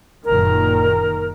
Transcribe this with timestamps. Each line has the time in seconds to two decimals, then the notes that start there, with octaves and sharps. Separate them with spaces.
0.25 F#1 A#2 D#3 A#4